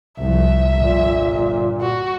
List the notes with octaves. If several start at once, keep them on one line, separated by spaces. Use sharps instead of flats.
C2 F3 E5
G1 A#2
F#4